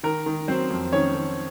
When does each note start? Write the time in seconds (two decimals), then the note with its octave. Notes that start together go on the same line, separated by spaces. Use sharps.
0.03 D#3 A#4
0.26 D#3
0.48 F#3 C4 C5
0.70 F2
0.92 D#3 C#4 C#5
1.15 D#3